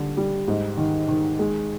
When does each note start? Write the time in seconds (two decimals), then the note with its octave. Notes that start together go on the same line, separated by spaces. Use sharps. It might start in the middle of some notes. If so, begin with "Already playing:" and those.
Already playing: D3 G3
0.17 G3
0.48 G#2
0.77 D#3
1.08 D#3
1.39 G#3